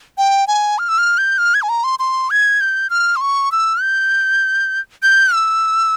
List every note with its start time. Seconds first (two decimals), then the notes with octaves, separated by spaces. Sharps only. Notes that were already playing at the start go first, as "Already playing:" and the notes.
0.18 G5
0.47 G#5
0.79 F6
0.89 E6
0.98 F6
1.18 G6
1.38 F6
1.54 G#6
1.62 G#5
1.69 A#5
1.84 C6
1.99 C6
2.30 G#6
2.61 G6
2.90 F6
3.16 C6
3.21 C#6
3.52 E6
3.81 G6
5.03 G6
5.34 E6